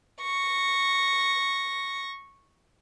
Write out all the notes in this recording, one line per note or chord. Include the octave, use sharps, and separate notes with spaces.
C#6 A#6